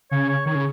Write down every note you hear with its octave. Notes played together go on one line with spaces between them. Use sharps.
C#3 C#5
C#5
D#3 C#5
C#3